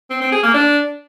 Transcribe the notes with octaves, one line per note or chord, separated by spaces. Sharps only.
C4
C4
G#4
A#3
D4